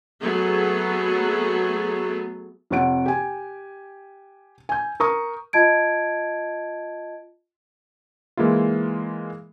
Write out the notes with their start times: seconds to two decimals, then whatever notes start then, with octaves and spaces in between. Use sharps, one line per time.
0.22 F#3 A3 B3 G#4
2.70 F2 C3 C#5 F#5 D7
3.06 G4 G#5
4.69 G#5 G6
5.00 A#4 A#5 C#6 D#6
5.53 F4 D#5 A5 G#6 D7
8.37 E3 G#3 A#3 E4 F4